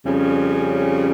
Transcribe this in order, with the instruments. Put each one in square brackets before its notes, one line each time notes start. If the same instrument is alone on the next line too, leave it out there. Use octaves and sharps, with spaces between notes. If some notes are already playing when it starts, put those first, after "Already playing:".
[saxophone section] F2 C#3 G3 C#4